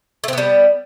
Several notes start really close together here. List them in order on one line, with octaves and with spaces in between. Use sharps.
A3 C4 B3 G3